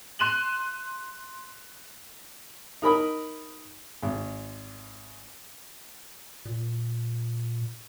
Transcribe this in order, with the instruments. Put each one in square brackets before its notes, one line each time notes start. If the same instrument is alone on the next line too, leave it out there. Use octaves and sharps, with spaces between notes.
[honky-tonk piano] C6 F#6 D#7 E7 F#7
[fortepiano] D#4 A#4 B5 D#6
G#1
[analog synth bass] A#2